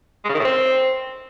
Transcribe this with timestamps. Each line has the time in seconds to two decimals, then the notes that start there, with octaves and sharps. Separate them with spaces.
0.24 G#3
0.29 C#3
0.34 D#3
0.40 A2
0.45 C4